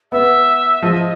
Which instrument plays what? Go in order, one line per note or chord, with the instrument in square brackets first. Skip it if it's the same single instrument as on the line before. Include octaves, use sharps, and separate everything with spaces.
[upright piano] B3 [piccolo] E5
[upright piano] F3 [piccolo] D#5